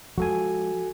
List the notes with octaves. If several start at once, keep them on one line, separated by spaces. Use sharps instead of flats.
F3 G#3 F#4 A4 G#5